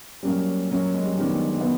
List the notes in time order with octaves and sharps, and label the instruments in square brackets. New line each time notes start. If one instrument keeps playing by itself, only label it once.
[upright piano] F#3 A#3 C#4 [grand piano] G3
[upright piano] F#3 A#3 C#4
[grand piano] G#3
G3
[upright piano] D#3 F#3 B3 D4 [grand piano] G3
[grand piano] G#3
G#3
B3